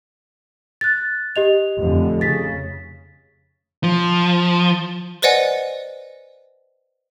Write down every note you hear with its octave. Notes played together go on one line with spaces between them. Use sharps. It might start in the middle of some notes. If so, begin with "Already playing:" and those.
F#6 A6
G4 D#5 F7
F1 D3
C#3 A6 B6
F3
B4 C5 D5 D#5 F#5 G#5